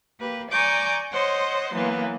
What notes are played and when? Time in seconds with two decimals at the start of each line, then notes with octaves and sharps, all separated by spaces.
0.20 A#3 G4 B4
0.50 D5 G#5 A#5 C#6 D6 G6
1.12 C5 C#5 D#5 F#5 C6
1.73 E3 F#3 A#3 B3